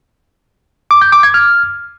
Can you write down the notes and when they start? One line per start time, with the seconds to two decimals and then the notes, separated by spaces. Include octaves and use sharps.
0.91 D6
1.01 G6
1.12 D6
1.23 G#6
1.34 F6